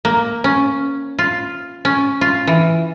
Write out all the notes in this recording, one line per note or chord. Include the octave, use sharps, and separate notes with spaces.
A#3
C#4
F4
C#4
F4
E3